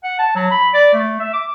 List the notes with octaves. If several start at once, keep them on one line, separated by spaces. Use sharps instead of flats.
F#5
A5
F#3
B5
D5
A3
E5
D6